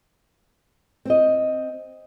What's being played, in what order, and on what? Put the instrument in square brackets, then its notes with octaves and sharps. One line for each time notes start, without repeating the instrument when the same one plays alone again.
[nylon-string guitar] C4 D#5